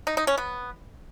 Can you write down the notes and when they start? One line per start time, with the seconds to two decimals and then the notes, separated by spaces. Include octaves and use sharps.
0.07 D#4
0.17 D#4
0.27 C#4
0.38 B3